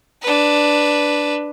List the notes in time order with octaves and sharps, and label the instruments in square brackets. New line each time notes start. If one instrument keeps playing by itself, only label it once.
[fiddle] D4 B4